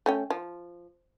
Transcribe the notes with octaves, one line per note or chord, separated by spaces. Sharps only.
A3 C#4 G5
F3